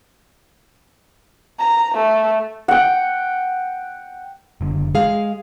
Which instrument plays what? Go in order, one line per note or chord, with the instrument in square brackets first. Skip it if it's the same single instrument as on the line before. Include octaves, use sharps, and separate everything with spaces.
[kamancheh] A#5
A3
[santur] F#5 G5
[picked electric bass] F#1 D3
[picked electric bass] G#3 [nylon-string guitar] G#4 F5